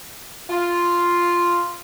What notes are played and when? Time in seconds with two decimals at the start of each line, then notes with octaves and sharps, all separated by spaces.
0.50 F4